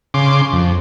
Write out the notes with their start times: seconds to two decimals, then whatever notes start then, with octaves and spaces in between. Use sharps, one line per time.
0.14 C#3 C6 D6
0.53 F2